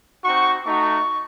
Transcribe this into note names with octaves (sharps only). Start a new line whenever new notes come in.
C4 D#4 F#4 C#6
A3 D#4 F#4 C#6